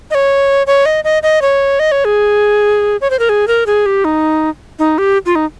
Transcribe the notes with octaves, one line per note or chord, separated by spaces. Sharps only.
D#5
C#5
C#5
D#5
D#5
D#5
C#5
D#5
C#5
G#4
C#5
C5
A#4
G#4
A#4
G#4
G4
D#4
D#4
G4
F4
D#4